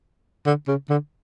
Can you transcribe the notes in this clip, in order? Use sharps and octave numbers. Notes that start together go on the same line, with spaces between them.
D3
C#3
D3